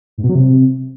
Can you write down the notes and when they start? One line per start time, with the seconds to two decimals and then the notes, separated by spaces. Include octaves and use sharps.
0.18 G#2
0.23 B2
0.29 F#3
0.35 C3